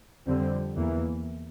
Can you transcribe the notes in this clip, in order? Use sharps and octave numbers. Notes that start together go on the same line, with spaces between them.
F2 D3 G3 C4
E2 E3 A#3